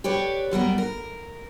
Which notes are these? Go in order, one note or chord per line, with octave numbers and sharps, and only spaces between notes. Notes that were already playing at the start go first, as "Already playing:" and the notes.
G4 B4 C#5 D5
F#2 G3 B3 A#4
A#4